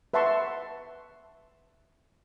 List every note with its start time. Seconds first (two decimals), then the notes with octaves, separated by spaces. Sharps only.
0.14 B4 E5 F#5 A5 C6 C#6